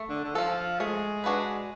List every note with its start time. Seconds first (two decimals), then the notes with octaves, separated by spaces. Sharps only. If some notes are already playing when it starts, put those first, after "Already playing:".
Already playing: A3
0.09 D3
0.24 D3
0.35 F3 F4 A4
0.80 G#3 A3
1.24 D4 F#4 B4